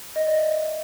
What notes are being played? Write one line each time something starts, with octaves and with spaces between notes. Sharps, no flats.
D#5
D5
E5